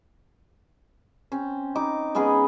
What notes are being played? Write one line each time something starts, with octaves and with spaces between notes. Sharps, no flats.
C4 C#4
D#4 D6
G#3 B3 C#4 G#4